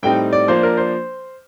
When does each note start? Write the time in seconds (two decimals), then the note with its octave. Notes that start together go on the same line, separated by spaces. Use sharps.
0.03 A2 G3 C4 D#4 G5
0.33 D5
0.48 F3 A#3 D4 C5
0.63 A#4
0.77 C5